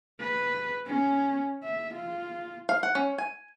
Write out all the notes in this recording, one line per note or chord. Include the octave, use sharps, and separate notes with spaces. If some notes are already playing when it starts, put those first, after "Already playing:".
B4
C#4
E5
F4
F5
F#5
C#4
G#5